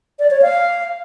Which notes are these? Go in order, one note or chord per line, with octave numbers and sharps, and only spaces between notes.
D5
C#5
F5